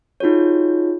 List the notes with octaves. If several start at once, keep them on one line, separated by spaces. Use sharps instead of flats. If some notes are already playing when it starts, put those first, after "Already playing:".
D#4 F4 F#4 G#4 C#5